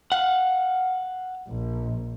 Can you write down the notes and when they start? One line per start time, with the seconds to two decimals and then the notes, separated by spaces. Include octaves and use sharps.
0.12 F5 F#5
1.48 A#1